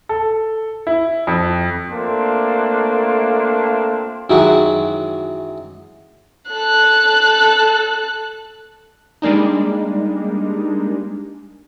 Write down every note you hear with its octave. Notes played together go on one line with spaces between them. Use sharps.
A4
E4
F2
A3 A#3 C4 D4 F4
F#2 D#3 E3 F#3 G#3 F#4
A4 F#6
G3 G#3 A#3 D4 D#4